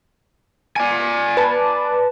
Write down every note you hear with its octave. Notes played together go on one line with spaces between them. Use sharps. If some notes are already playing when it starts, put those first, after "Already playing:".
D5 G#5
B4 A5